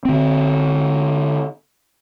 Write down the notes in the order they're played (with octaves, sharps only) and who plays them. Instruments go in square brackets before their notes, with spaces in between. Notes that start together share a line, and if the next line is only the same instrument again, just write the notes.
[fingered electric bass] D3 C4